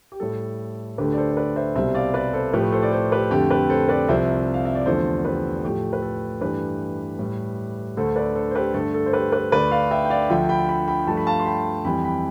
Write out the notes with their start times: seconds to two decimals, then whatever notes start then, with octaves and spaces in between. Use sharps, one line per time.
0.12 G4
0.20 A2 G3 A4
0.98 D2 D3 A3 G4 B4
1.13 D5
1.17 A4 C5
1.32 C5
1.37 B4 D5
1.56 C5 E5
1.75 C2 B2 G3 C5 E5
1.95 D5 F5
2.14 B4 D5
2.33 A4 C5
2.53 A2 F3 A3 G4 B4
2.72 A4 C5
2.82 D5
2.92 A4 C5
3.12 G4 B4
3.31 F2 D3 A3 G4
3.50 G4 B4
3.70 A4 C5
3.89 B4 D5
4.08 C2 C3 F3 C5 E5
4.54 F5
4.65 E5
4.75 D5
4.86 E2 D3 F3 A3 A4 C5
5.25 G4 B4
5.64 A2 F3 A3 G4
5.93 B4
6.02 A4
6.41 G2 E3 A3 G4 B4
7.19 A2 G3
7.97 D2 D3 A3 A4 C5
8.16 B4 D5
8.36 A4 C5
8.51 C5
8.55 G4 B4
8.74 G2 D3 A3 A4
8.94 A4
9.06 C5
9.13 G4 B4
9.32 G4 B4
9.52 D2 D3 A3 B4 D5
9.71 D5 F5
9.91 E5 G5
10.05 G5
10.10 D5 F5
10.29 D2 D3 F3 E5 G5
10.49 G5 B5
10.69 G5 B5
10.88 G5 B5
11.07 G2 F3 A3 A5
11.17 B5
11.27 F5 A5
11.40 C6
11.46 G5 B5
11.85 F2 E3 G3 G5 B5
12.04 G5 B5